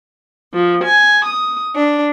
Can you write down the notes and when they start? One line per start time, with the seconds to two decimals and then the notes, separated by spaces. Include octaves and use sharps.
0.54 F3
0.85 G#5
1.27 D#6
1.74 D4